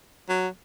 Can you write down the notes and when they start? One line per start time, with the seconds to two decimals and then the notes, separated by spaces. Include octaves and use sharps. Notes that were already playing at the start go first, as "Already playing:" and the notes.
0.29 F#3